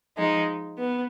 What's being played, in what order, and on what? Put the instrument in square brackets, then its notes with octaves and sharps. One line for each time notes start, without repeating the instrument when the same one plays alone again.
[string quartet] F3 G#3 D#4
B3